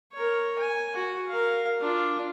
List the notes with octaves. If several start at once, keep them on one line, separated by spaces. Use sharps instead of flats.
A#4 C#5
G#5
F#4
A#4 F5
D4 F4